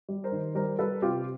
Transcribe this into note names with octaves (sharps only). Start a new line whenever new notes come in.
G3
A#4 C5
D#3
G3 A#4 C5
G3 A4 B4
C3 F4 G4